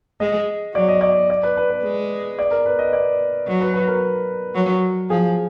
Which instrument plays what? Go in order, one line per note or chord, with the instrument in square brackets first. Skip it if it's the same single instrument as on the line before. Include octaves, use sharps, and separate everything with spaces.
[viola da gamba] G#3 [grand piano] D#5
[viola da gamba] F#3 [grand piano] D5
[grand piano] D#5
D5
D5
B4
B4
B4
[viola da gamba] G#3
[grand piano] D5
A#4
B4
D#5
D5
[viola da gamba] F#3
[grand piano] B4
B4
A#4
[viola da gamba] F#3
[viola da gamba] F3 [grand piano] G#4